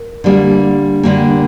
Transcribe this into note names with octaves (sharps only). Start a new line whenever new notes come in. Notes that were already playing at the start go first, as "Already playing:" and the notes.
Already playing: A#4
D3 G3 A#3
D3 G3 A#3